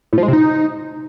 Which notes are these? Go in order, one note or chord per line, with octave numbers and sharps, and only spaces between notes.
A2
F3
G#3
C3
D#4